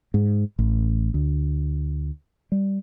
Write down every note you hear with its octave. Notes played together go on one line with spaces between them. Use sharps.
G#2
A1
D2
G3